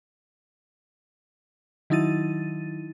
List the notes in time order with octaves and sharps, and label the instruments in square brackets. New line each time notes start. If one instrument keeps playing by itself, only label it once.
[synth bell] D#3 F#3 D#4 E4 A6 D#7